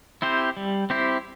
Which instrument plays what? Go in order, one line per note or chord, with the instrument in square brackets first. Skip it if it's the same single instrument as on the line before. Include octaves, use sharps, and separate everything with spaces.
[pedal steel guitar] C4 E4 G4 C5
G3
C4 E4 G4 C5